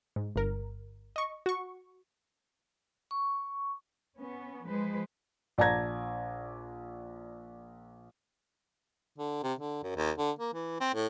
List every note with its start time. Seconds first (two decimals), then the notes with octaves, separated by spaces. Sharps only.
0.16 G#2
0.36 G1 A#4
1.16 D#5 C#6
1.46 F#4 C#6
3.11 C#6
4.17 B3 C#4
4.65 F3 G#3 B4 C5
5.58 A#1 D5 A5 A#5 G#6 A#6
9.18 D3
9.43 C3
9.59 D3
9.83 F#2
9.96 D#2
10.18 D3
10.39 A#3
10.54 E3
10.80 C4
10.94 A2